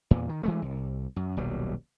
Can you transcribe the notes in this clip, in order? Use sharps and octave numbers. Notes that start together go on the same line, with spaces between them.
E2 A#2
D#3
E3 G#3 A3
C2
F#2
D#1 B1 F#3 G3